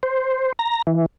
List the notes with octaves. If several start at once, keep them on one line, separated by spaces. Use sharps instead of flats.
C5
A#5
E3